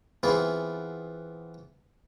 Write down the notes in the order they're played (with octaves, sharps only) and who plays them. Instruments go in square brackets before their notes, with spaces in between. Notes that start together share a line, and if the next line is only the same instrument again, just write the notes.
[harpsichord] E3 B3 C4 F4 G#4